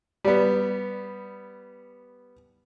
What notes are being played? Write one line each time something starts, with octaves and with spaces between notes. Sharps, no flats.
G3 B3